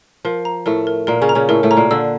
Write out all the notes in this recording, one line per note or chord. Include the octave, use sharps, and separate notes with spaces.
F3 A#4
A#5
A2 A3 A#4
A#4
A#2 A#3 A#4
C#3 C#4
A#5
C#3 C#4
A2 A3 A#4
A2 A3
C#4 A#5
A#2 A#3
D3 D4 E6